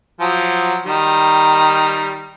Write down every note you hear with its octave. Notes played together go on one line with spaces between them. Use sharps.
F3 F#3
D#3 G3